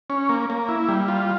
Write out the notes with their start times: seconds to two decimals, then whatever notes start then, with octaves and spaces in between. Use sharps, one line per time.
0.10 C#4
0.29 A#3
0.50 A#3
0.68 E4
0.88 G3
1.08 F4